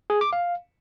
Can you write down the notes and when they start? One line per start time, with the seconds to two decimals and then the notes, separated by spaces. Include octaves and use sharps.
0.10 G#4
0.21 D6
0.33 F5